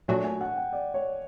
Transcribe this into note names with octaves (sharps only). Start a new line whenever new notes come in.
A#2 F#3 A3 D4 F#4 G#5
G#5
F#5
G5
D5
C#5